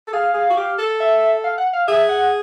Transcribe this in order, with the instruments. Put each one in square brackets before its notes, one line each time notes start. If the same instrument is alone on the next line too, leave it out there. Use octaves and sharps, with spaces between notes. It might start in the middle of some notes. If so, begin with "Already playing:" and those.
[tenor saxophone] A4
[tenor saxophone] G#4 [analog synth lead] F5
[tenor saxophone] G#4
F#4
G4
A4
[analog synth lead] E5
F5
F#5
F5
[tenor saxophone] G#4 [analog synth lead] E5
[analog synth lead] F#5